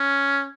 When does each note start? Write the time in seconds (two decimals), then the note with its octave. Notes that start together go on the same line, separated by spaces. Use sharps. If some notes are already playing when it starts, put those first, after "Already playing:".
Already playing: C#4